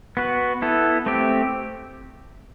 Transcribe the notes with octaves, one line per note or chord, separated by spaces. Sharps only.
B3 F#4 B4
B3 E4 A4
A3 C4 G4